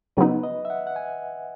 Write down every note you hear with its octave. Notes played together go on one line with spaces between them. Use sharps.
C#3 F#3 B3 D#4 B4
D#5
E5
F#5
F#5
G#5